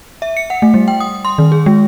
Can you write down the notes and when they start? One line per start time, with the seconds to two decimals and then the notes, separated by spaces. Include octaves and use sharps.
0.22 E5
0.37 C#7
0.50 F#5
0.62 A3
0.74 G3
0.88 G5
1.00 D#6
1.25 C6
1.38 D#3
1.52 G#4
1.66 G#3